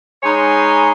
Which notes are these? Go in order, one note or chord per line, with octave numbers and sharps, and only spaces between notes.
G#3 D#4 C#5 G#5 B5 C6